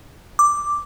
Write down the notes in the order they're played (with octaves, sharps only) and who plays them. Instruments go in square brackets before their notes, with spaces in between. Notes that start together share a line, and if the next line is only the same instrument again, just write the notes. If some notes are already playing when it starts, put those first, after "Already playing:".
[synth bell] D6